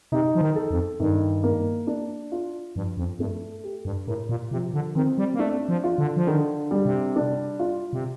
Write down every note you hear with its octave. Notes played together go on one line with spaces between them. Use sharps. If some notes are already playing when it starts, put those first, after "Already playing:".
C3 D#4
F3
D#3
A4
F2
G2 D#3
A#3
D4
F4
G2 F3
F2
G2 A3
G4
G2
A2 A#4
A#2
C3 F3
D3
D#3 C4
G3
A#3
A3 D4
F3
F4
D3
F3
D3 D#3
G3
C3
D4
F4
C3